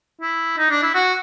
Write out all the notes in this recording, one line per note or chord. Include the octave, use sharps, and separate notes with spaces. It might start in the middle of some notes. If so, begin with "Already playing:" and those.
E4
D#4
D4
E4
F#4